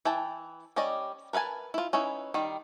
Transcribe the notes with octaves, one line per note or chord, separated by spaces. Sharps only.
E3 G5 A5
G3 C#4 D5 D#5
A#4 B4 E5 G#5 A5
E4 F4
C#4 D#4 E4 B4
D#3 G3